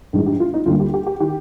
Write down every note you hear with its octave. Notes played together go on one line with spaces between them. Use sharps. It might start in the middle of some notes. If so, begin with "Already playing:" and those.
A#1 G#2 D#3 G#3 D#4
G4
F4
D#4
D2 D3 G3 A#3 F4
G4
G4
G4
D#3 G4